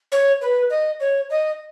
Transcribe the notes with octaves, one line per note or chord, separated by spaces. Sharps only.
C#5
B4
D#5
C#5
D#5